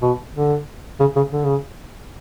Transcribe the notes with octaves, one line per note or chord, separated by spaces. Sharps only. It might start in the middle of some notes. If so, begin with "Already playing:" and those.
B2
D3
C#3
C#3
D3
C#3